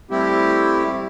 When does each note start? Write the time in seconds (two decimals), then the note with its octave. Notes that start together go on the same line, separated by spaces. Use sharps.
0.11 G3 A3 C4 E4 G4